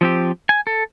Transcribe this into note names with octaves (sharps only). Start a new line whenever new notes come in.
F3 C4 G4
G#5
A4